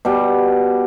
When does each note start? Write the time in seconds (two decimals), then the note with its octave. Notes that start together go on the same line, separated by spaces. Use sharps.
0.05 B2 G3